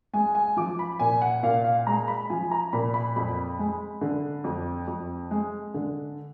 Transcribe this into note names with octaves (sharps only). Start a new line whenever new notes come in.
G#3 G#5
G#5
F3 D6
B5
A#2 G#5
F#5
A#2 F5
F5
G#3 A#5
B5
F3 G#5
A#5
A#2 B5
B5
F2 B5
G#3
D3
F2
F2
G#3
D3